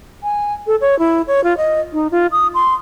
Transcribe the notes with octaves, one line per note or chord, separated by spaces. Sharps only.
G#5
A4
C#5
E4
C#5
F4
D#5
D#4
F4
D#6
C6